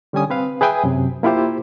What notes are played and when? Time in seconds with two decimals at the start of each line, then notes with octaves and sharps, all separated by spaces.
0.13 D3 G3 C#4 G#5 D#6
0.30 C4 B4 F5
0.61 G#4 B4 E5 G5 G#5 D#6
0.84 F#2 C3
1.23 A#3 E4 F4 G4 C5